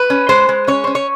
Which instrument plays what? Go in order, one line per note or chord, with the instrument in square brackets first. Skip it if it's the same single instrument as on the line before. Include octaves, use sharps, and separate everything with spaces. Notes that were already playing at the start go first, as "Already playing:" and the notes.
Already playing: [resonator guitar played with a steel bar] B4
C#4
G#3 C5
G#3
C#4 C#5
C#4 C5
C#5